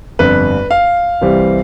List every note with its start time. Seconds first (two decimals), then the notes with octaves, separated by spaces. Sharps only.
0.19 G1 F2 D3 B4
0.71 F5
1.21 C2 C3 E3 G3 C4